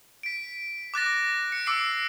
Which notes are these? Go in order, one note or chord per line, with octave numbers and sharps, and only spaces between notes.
B6 D7
D6 F#6 A6 A#6
C#7
D6 E6 C7 D7